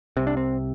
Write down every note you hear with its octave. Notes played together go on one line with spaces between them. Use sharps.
C2 C3 C4
D4
C4